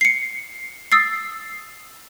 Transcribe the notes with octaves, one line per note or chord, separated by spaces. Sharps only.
C7 C#7
D#6 E6 A6 C7